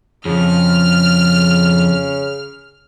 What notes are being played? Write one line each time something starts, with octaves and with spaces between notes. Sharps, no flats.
F2 C#3 F6